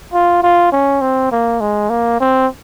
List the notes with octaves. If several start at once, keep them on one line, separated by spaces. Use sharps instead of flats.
F4
F4
C#4
C4
A#3
G#3
A#3
C4